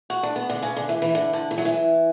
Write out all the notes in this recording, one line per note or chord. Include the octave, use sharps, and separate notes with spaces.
F#4
D4
B3
D3
C#3
D3
E3
E3
D3
D3
E3
F#3
E3